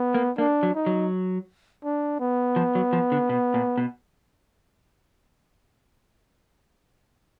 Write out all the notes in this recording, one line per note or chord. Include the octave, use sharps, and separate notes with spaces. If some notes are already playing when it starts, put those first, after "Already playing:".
Already playing: B3
A#3
A#3 D4
F#3
D#4
F#3
D4
B3
F3
F#3
F3
D3
B2
A#2
B2